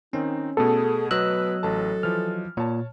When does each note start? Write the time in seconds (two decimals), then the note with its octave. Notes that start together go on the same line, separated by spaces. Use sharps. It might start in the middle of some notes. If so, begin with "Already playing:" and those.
0.13 D#3 C4 C#4 D#4
0.57 B2 A3 B3 G#4 A4
1.11 F#3 B4 D#5 E6 F#6
1.63 A1 A4 A5
2.03 E3 F3 F6
2.57 A#2 C#5 A5